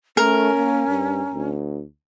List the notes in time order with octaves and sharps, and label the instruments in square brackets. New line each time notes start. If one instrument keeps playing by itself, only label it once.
[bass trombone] A3 [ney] C#4 [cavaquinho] A#4
[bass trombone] A#3
G2
D2